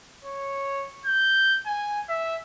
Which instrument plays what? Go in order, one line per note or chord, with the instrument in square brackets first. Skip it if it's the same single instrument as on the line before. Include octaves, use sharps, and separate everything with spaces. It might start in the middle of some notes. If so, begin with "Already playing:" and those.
[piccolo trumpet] C#5
G6
G#5
E5